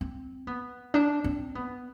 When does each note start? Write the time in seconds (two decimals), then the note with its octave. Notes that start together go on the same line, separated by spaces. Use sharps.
0.01 C4
0.47 B3
0.94 D4
1.24 C4
1.55 B3